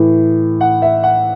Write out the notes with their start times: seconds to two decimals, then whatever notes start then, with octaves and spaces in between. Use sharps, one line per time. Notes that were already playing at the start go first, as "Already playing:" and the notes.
Already playing: A2 E3
0.61 F#5
0.82 E5
1.03 F#5